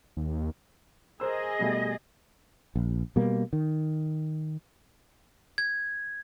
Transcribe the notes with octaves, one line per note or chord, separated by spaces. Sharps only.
D#2
G#4 A#4 C5 D#5 E6
B2 G3 A3
A#1
B2 G3 A#3
D#3
G#6